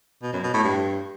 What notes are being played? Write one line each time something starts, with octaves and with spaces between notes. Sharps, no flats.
B2
F#2
B2
A2
G2